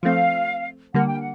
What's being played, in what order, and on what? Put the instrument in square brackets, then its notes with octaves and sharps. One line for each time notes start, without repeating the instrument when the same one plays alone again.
[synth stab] F3 A3 C4 [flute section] F5
[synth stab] D3 G3 A#3 [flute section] F#5
[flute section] G5
F#5